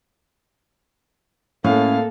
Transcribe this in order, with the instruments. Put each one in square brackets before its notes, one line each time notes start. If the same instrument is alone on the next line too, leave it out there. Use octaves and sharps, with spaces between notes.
[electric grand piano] A2 [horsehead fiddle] A#3 A4 [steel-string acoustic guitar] C#4 [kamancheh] F5